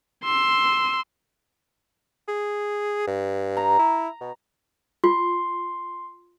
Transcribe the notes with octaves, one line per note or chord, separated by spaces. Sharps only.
C6 E6
G#4
G2
A#5
E4
B2
F4 C6